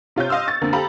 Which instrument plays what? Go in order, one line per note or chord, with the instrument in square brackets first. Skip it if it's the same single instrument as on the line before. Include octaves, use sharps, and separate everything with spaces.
[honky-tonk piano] C3 F4 C#5 G6
D#5 F5 C6 E6 F6
C#6 A6
F2 D3 A#3
G4 A4 F5 A#5 B5